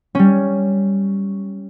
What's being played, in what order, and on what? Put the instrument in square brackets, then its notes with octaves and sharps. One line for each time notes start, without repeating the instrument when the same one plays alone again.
[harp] G3 C#4